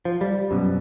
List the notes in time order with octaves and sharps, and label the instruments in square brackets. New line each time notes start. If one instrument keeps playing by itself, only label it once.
[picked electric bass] F3
G3
F#2 B2